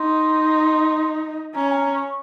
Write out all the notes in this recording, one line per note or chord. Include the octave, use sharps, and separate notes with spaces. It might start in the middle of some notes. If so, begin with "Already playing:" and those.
Already playing: D#4 C6
C#4 A#5
G#5
A#5
C#6